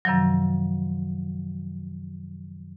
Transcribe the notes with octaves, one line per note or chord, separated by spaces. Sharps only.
F#2 C3 D#3 F3 F#3